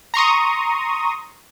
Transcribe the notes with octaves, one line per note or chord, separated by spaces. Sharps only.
A#5 C6 C#6 D#6